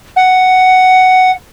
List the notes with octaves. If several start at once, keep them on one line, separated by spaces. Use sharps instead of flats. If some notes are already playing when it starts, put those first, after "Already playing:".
F#5